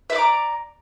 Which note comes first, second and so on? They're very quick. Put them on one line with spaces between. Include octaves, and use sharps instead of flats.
E5 D5 D6 A#5